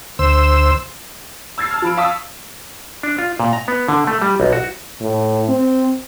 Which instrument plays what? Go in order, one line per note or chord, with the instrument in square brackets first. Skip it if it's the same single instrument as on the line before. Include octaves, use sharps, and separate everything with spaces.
[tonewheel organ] D2 C5 E6
[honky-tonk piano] E6 G#6 A6 C7
A5 F6
F3 B5 D7
F5 A5 C#6 D#6 E6 B6
[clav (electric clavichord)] D4
F4
A#2
A#5
B3
D3
A3
G3
B1
F#4
[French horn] A2
C4